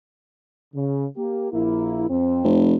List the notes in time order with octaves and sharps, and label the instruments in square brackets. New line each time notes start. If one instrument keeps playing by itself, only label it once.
[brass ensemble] C#3
A#3 G4
A#1 A#3 E4
F2 C4
[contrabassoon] F1